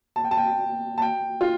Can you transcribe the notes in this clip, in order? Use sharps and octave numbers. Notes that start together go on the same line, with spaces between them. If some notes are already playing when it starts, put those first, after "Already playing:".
A5
G5
A5
G5
A5
G5
F4